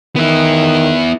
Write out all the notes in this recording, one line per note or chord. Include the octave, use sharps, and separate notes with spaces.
D#3 B3 E4